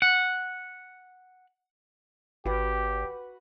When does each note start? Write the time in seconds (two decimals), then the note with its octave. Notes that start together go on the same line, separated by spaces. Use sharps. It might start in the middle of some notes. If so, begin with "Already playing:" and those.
0.02 F#5
2.45 G#1 F#4 G4 B4 F#5